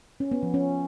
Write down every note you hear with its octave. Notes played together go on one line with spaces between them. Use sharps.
C#4
B3
F3
C#4